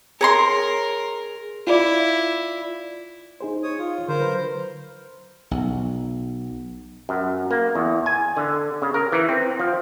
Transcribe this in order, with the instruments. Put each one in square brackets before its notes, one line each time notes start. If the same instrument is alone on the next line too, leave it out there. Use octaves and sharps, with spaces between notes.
[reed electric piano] G#4 [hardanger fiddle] A#4 [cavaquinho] C#5 A#5 C6
[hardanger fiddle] E4 [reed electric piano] F4 D5
[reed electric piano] D#4 G#4 C5
[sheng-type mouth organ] C#5 D#6
F4
[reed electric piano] D3 [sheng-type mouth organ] A#4 C5
[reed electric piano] F#3 B4
[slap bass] B1
[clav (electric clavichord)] F#2
A#3
E2
G#5
D3
C#3
A#4
E3
C4
F3